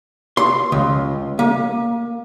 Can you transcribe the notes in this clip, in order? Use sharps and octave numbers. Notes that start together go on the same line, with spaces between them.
C6
C#2
A#3